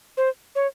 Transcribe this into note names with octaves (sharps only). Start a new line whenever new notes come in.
C5
C#5